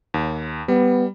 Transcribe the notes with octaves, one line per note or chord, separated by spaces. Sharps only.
D#2
G3 B3